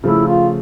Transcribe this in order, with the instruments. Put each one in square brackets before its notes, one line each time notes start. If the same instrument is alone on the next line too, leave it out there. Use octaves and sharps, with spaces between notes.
[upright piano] C#3 F3 A3 [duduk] E4
[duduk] F4